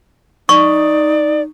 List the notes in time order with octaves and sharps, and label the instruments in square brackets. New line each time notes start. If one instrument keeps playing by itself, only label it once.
[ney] D#4 [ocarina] D5 [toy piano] C#6